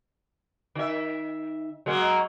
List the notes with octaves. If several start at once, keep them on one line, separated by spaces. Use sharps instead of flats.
D#3 E5
F#3 G#3 A#3